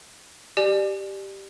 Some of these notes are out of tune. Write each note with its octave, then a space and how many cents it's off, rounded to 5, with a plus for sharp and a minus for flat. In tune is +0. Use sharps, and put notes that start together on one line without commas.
G4 -5 D5 +25 G#5 +20